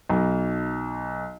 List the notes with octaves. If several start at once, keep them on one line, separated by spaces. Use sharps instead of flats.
B1